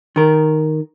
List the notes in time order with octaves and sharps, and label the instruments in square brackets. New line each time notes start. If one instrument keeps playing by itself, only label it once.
[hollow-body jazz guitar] D#3 A#4